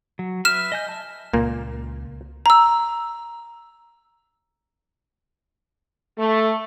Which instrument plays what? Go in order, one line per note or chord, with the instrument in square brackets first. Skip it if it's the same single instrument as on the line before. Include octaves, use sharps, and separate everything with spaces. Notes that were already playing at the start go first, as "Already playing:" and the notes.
[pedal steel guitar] F#3
[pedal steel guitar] B4 E5 [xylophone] F6 E7
[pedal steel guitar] D#5 G#5 G6
E5 A5
[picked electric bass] C#2 [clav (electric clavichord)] A#2 A#3
[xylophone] A#5 E6
[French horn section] A3